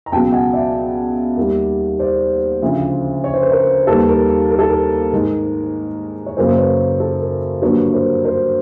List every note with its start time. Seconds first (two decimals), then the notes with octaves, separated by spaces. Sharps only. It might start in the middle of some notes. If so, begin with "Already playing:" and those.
0.06 A#5
0.12 C#2 B2 F#3 G5 A5
0.32 F#5 G#5
0.53 D5 E5
1.37 D#2 D#3 G3
1.99 C5 D5
2.62 D2 C#3 F3
3.24 C#5
3.34 C5
3.42 B4
3.52 A#4 C5
3.87 D#2 D#3 G3 A4 B4
4.08 A#4
4.50 A#4
4.59 A4
4.69 A#4
5.12 G#2 D#3 G#3
6.26 C#5
6.37 F#2 C#3 F#3 A#3 A#4 C5
6.58 B4 C#5
7.00 A4
7.21 A#4
7.62 G2 D3 F#3 A#3 B4 C#5
7.93 A#4 C5
8.25 A#4 C5